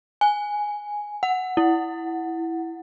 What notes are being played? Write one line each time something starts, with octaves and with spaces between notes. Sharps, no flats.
G#5
F#5
E4